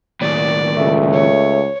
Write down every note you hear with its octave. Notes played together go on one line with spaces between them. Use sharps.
D#2 A2 D5
C#2 A3
C#5